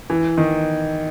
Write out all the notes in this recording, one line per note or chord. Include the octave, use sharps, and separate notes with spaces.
E3
D#3